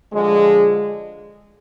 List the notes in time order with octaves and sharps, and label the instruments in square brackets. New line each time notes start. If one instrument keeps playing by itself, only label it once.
[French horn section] D3 F3 G#3